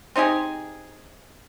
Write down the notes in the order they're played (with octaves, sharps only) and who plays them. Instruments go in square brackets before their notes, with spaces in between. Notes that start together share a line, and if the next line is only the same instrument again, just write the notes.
[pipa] C4 D#4 G4 G#4